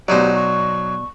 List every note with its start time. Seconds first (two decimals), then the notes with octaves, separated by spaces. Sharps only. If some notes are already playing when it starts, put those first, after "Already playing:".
0.08 B2 F#3 D#4 G4 C5 D5
0.35 C#6